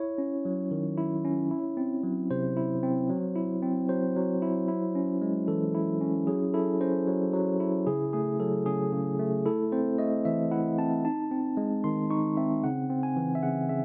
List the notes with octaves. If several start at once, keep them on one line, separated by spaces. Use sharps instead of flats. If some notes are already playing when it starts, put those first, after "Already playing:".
Already playing: E4 C#5
C#4
F#3
D#3
E4
C#4
E4
C4
F#3
C3 C5
E4
C4
F#3
E4
C4
F#3 C5
F#3
E4
E4
C#4
G#3
E3 A4
E4
C#4
F#3 G#4
E4 A4
C#4 C5
F#3
F#3
E4
C#3 G#4
A3 G#4
F#3 A4
C#3 G#4
C#3
A3
E4 A4
C4 C5
A3 D#5
E3 E5
E4 F#5
C4 A5
D#4 A5
C4
G#3
D#3 C6
D#4 C#6
C4 E5
C#3 F#5
C4
G#5
E3
E5
C#3 F#5
C#3 E5